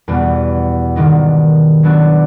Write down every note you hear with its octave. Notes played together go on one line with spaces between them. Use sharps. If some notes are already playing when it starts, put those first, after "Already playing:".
E2 B2 G3 B3
G#2 D#3 G3 B3 D#4
F#3 B3 D4 F#4